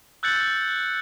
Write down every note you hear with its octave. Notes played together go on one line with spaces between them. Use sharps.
E6 F#6 G6 A6 C#7 F#7